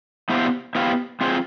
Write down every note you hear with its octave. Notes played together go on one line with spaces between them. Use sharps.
B3 E4 G4 C5 F5
B3 E4 G4 C5 F5
C4 F4 G#4 C5